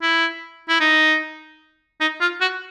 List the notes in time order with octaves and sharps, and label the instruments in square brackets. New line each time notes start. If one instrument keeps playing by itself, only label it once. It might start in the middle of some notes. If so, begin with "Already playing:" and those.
[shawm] E4
E4
D#4
D#4
F4
F#4